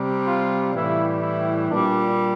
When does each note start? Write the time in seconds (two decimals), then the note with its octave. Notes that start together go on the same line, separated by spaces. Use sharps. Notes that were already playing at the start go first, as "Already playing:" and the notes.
Already playing: C3 G3
0.26 F4
0.73 A2 E3 G3 E4
1.22 E4
1.69 A#2 G3 D4